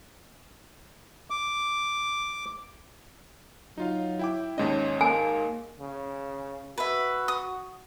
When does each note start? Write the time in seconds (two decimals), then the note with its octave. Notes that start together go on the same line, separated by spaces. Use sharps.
1.30 D6
3.78 F#3 D#4 F4 F5
4.19 E4 G5 D6
4.58 D#2 G#2 C#4 D#5
5.01 A#3 G#5
5.80 C#3
6.78 F#4 B4 E5
7.28 D#6